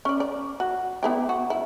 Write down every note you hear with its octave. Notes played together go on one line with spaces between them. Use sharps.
C#4 D5
D5
F#4
B3 E4 G4
F#4
E4